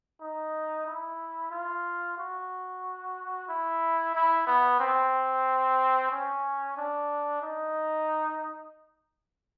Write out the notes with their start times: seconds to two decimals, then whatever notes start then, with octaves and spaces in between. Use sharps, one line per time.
0.21 D#4
0.86 E4
1.51 F4
2.18 F#4
3.48 E4
4.15 E4
4.47 B3
4.80 C4
6.11 C#4
6.77 D4
7.42 D#4